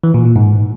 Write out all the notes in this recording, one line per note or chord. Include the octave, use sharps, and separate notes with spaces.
E3
A#2
A#2
G#2